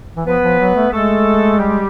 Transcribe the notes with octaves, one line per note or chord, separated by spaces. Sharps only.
E3
F3 B3 B4
F3
F#3
A3
G#3 A3 A4
G3 G4